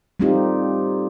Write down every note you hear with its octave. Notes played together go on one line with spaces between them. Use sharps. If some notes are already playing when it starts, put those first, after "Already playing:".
G3 A3 C4 D#4 F4 G4